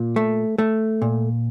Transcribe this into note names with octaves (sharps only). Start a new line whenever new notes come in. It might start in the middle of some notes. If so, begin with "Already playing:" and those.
Already playing: A#2
A3
A3
A#2